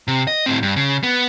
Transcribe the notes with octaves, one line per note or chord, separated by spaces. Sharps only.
C3
D#5
A2 C4
G2
C#3
B3